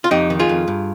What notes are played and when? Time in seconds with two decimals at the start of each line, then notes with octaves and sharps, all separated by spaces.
0.04 F4
0.11 F2 D#4 G4
0.30 D#3
0.39 F4 G#4
0.49 F2
0.68 G2